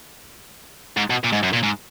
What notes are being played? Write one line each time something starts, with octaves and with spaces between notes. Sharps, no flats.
G#2
B2
A#2
G#2
F#2
A#2
G#2